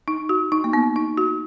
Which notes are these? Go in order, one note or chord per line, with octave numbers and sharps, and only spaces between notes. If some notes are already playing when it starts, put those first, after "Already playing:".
D#4
F#4
D#4
A#3
B3
D#4
F#4